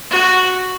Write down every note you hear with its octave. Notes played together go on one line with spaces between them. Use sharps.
F#4